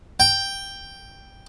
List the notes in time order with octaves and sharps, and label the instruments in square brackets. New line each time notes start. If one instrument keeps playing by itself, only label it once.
[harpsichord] G5